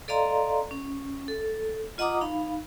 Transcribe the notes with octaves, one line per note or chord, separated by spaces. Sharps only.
A4 D5 D#5 F5 A#5 C6
C#4
A4
F4 D#5 F#5 A#5 D6 D#6
D#4 F5 B5